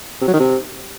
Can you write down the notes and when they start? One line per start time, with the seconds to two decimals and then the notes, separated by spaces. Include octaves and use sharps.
0.21 C3
0.27 F#3
0.34 D#3
0.40 C3